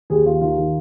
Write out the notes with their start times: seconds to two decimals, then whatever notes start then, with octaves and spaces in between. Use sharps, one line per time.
0.10 D#2 G#4
0.26 D#2 F4
0.41 D#3 F4
0.58 D#3